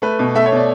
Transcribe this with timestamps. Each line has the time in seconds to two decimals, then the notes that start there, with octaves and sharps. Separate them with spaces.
0.02 A3 B4
0.19 B2
0.35 A3 E5
0.46 C#5
0.52 B2 D5